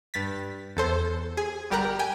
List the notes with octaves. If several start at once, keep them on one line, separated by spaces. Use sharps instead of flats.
G2 A6 B6
E2 A4 C5
G#4
G1 G3 G4 A#4 A#5 F#6
G5 G#5